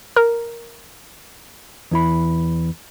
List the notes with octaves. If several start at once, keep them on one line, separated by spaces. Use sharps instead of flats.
A#4
E2 E4 B5